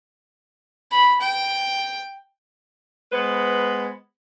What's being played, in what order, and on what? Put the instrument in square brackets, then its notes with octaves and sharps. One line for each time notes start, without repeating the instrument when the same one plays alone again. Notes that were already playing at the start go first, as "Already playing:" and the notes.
[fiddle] B5
G5
[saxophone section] G#3 B3 B4 C5